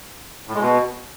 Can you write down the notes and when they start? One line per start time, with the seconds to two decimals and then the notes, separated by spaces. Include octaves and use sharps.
0.48 A2
0.55 G#3
0.61 B2